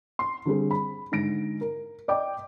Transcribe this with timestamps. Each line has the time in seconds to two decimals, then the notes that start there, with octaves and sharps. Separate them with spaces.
0.19 C6
0.45 D3 G3 C4 G#4
0.71 B5
1.12 G#2 D3 A#6 D7
1.61 A#4
2.08 D5 D#5 G5 D6